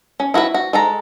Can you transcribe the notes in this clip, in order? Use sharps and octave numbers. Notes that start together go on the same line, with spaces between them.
C#4
E4 F#4 A4 B4
F#4
G#3 A4 A#5